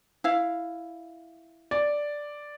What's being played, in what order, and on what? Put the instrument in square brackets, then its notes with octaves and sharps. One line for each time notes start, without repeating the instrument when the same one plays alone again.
[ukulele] E4 F5
[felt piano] D5